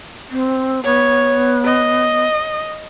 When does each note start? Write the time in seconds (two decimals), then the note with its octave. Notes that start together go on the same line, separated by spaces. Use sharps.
0.31 C4
0.84 B3 C#5
1.65 D#5